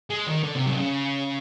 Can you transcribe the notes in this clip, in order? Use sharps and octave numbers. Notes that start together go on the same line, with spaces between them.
G#3
D#3
D3
C3
F#3
C3
C#3